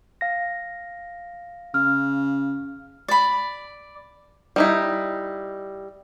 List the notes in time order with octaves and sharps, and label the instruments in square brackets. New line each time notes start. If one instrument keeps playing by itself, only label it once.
[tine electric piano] F5 A#6
[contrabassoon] C#3 [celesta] F6
[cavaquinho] D5 B5
[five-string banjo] G3 D#4 E4